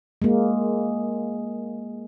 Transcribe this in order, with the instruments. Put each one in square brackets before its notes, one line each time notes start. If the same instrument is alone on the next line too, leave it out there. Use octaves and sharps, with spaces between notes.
[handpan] G#3 A#3